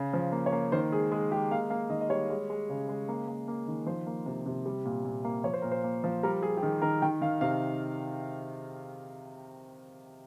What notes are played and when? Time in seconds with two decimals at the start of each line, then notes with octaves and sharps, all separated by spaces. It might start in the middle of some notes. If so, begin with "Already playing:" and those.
Already playing: C#3
0.13 F3
0.32 A#3
0.46 C#5
0.52 A#3
0.72 D#3 C5
0.92 G#3 G#4
1.12 G#3 G#4
1.31 G#3 G4
1.51 A#3 F5
1.70 A#3 F5
1.90 D#3 D#5
2.01 D#5
2.09 G3 C#5
2.30 G#3
2.50 G#3
2.69 C#3
2.89 G#3
3.09 A#3
3.28 A#3
3.48 A#3
3.68 D#3
3.86 F3 C5
4.07 A#3
4.26 C3
4.46 C3
4.66 G3
4.86 A#2
5.05 A#2
5.25 A#3
5.44 F3 C#5
5.54 C5
5.62 A#2 A#4
5.71 C5
5.84 A#3
6.04 F3
6.23 G3 A#4
6.42 G3 G#4
6.57 G4
6.63 D#3 G#4
6.82 D#3 A#4
7.02 D#3 G5
7.21 D#3 F5
7.41 C3 F5